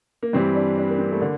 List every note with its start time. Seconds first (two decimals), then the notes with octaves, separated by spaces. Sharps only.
0.23 A#3
0.33 G2 E3 G3 C4
0.55 D4
0.78 D4
0.90 A#3
0.98 C4
1.12 A3
1.20 D3 A#3